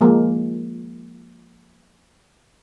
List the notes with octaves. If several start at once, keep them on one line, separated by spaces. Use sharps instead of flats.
F3 G#3 A#3